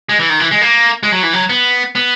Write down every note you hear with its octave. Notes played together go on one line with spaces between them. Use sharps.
G#3
E3
D#3
E3
G#3
A#3
G#3
F#3
E3
F#3
B3
B3